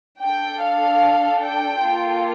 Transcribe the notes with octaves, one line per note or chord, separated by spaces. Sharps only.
D4 A4 G5
F5
G5
A#3 F4 A4